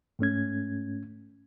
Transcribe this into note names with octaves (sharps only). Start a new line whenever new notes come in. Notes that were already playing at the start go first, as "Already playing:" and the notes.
G#2 A3 C#4 G#6